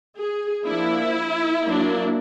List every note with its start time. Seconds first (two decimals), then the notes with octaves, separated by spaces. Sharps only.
0.18 G#4
0.67 F3 A#3 D4 E4
1.66 F#3 A#3 D4